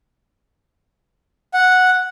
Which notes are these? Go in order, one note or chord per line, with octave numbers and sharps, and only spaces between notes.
F#5